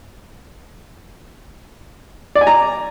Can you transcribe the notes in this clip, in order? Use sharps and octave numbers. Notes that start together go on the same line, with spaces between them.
D5
G#5
A#5